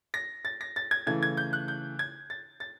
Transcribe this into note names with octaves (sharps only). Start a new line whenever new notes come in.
A#6
A6
A#6
A6
G#6
C#3 E3 A3 G#6
G#6
G6
F#6
G6
G#6
A6
A6